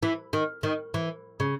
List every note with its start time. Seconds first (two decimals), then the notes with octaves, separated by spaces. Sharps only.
0.03 E3
0.33 D#3
0.63 D#3
0.94 E3
1.40 C#3